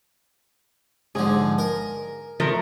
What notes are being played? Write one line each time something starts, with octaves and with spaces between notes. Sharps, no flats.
G#2 D3 F3 G#4
A#4
F3 A3 A#4